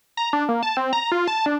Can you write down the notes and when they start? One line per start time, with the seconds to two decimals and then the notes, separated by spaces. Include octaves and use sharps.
0.17 A#5
0.33 D4
0.49 A#3
0.63 A5
0.77 C4
0.93 A#5
1.12 F4
1.27 A5
1.46 D4